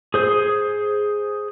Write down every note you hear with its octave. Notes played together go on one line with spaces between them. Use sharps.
G#4 C5 D#6